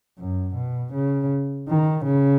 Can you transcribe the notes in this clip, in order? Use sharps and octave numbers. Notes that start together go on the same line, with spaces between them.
F#2
B2
C#3
D#3
C#3